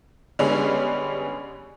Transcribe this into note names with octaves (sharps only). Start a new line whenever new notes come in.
D3 G3 G#3 B3 C#4